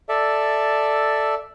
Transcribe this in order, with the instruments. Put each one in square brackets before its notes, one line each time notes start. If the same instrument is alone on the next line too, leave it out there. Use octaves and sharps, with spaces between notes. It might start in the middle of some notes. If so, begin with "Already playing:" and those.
[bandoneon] A4 D5 E5